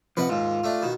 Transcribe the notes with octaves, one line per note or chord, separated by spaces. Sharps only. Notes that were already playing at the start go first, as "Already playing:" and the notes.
C3 F3 B4 D#5 F#5
D#2 G#2 F4
A3 D4
B2 D#3